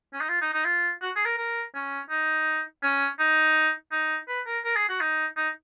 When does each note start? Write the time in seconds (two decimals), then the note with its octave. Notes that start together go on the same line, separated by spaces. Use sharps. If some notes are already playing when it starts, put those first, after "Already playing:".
0.13 C#4
0.21 D#4
0.29 F4
0.41 D#4
0.53 D#4
0.65 F4
1.02 F#4
1.16 G#4
1.25 A#4
1.38 A#4
1.75 C#4
2.10 D#4
2.83 C#4
3.19 D#4
3.92 D#4
4.28 B4
4.46 A#4
4.64 A#4
4.76 G#4
4.89 F#4
5.00 D#4
5.37 D#4